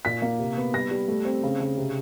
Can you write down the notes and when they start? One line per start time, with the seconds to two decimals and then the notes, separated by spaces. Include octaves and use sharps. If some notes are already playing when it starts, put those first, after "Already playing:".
0.05 A#2 B6
0.22 A#3
0.39 C3
0.57 B3
0.74 G3 A#6
0.91 G3
1.08 A3
1.25 C4
1.43 C#3
1.60 C#3
1.77 C3